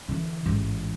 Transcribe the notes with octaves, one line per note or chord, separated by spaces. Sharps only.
D3 E3
A1 G#2